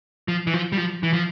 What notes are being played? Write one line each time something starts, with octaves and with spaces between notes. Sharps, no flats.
F3
E3
F3
G3
F3
E3
F3